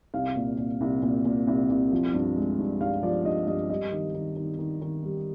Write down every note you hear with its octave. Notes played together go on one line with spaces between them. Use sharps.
C2 F5
A#2
A#2
C2
A#2
A#2
C2
C2
F3
G2
G#3
G2
G2 F5
F3 D5
G2 D#5
G2 D#5
G3 D#5
D#3
D#3
D#3
D#3
D#3
G3